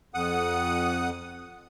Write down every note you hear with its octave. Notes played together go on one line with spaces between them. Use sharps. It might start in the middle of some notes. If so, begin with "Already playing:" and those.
F2 F#5 D#6